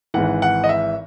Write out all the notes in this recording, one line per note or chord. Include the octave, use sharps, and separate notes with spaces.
G#1 G#2 E3 F#5
F#5
D#5
E5